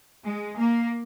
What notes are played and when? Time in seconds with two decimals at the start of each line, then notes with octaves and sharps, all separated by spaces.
0.25 G#3
0.57 A#3